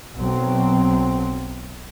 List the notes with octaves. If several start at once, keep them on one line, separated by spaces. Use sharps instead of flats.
B1 F#3 C4